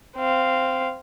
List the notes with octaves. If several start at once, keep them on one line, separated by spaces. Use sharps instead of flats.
C4 F5